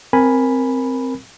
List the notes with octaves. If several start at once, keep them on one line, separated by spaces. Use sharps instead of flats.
C4 A#4 G#5 B5